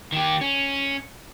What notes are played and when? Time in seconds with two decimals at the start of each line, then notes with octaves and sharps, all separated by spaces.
0.12 D#3 G4
0.41 C#4